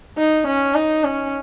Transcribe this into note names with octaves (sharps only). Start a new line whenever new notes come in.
D#4
C#4
D#4
C#4